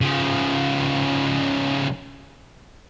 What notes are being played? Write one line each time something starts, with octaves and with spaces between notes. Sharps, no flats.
C#3 F3